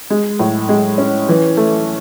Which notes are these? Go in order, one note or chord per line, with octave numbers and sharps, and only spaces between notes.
G#3
A2
G#3
C#4
E3
A3